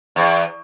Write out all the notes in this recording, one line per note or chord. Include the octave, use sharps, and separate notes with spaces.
E2